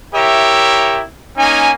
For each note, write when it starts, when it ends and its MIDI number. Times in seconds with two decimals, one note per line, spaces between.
0.13 1.02 64
0.13 1.02 67
0.13 1.02 70
0.13 1.02 73
0.13 1.02 76
1.38 1.70 58
1.38 1.70 61
1.38 1.70 63
1.38 1.70 80